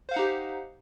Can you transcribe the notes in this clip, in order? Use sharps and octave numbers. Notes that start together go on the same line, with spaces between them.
D#4 G4 C5 F5 F#5